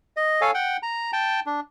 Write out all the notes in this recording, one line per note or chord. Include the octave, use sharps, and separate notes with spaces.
D#5
A4 C#5 F5 G#5
F#5 G5
A#5
G5 A5
D4